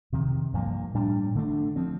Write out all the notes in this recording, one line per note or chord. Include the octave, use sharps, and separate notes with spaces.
F2 C3 D#3
G2 F3 A#3
A2 G3 D4
D3 A3 D4
F3 C4